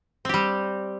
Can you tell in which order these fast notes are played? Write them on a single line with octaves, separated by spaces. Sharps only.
C4 G4 G3